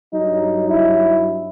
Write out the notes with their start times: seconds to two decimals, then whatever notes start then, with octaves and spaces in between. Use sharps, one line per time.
0.13 G2 F#3 D#4
0.68 E4